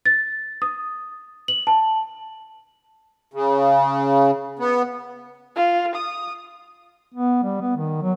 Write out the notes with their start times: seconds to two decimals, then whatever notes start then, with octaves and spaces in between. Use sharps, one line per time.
0.06 A6
0.62 D#6
1.48 F#7
1.67 A5
3.34 C#3
4.59 B3
5.56 F4
5.96 D#6
7.15 B3
7.43 G3
7.61 B3
7.76 D#3
8.02 F#3